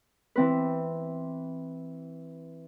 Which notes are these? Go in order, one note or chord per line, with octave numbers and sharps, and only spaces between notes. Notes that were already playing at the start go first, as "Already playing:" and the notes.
E3 C4 B4